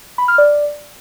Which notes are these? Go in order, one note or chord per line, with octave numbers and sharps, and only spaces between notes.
B5
F6
D5